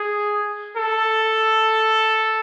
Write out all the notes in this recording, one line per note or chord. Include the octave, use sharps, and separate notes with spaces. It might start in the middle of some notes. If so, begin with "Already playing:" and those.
Already playing: G#4
A4